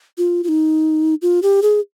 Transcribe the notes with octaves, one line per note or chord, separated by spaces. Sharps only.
F4
F4
D#4
F4
G4
G#4